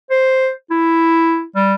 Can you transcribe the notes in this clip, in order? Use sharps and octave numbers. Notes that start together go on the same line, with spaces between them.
C5
E4
G3